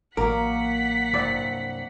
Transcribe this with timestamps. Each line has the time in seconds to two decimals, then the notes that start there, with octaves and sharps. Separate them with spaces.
0.17 A1 F#3 A#3 A#4 F#5 D6 B6
1.13 C2 G2 D5